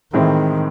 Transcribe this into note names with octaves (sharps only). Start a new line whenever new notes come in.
A2 D#3 E3 G#3 C4